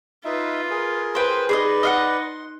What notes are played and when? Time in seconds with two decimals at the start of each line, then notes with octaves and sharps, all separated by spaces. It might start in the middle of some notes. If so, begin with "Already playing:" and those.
0.25 D#4 F4 B4 E5
0.70 G#4 A#4
1.15 B4 C5 G5
1.49 D#4 G#4 B4 C5 D5 D#5
1.83 D#5 F5 F#5
2.22 C6